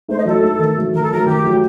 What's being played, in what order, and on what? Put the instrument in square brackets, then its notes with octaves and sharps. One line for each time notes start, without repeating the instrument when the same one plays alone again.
[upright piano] A3 D#4 [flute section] C5
[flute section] D#5
[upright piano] F#3 [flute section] A4
[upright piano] A3 D#4
D#3
F#3 A3
[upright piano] D#3 [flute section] A#4
[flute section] A4
[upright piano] F#3 A3 [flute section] A#4
[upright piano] D#3 [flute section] G4
[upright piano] F#3 A3